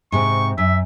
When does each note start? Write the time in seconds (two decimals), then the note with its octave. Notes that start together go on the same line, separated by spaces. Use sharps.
0.12 G#2 C3 C4 C#6
0.58 F#2 E5